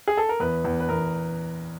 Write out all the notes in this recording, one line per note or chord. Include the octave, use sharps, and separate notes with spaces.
G#4
A4
A#4
E2 B4
E2
B4
E2 A#4